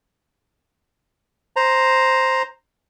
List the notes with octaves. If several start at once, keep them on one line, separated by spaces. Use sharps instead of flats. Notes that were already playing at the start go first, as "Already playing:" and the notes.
C5 A#5